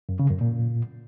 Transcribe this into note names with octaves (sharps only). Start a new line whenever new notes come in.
F#2
C#3
F#2
A#2